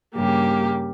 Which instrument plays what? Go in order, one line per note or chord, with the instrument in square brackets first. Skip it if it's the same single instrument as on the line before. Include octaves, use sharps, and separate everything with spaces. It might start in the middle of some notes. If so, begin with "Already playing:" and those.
[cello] G2 C#3 [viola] A#3 G4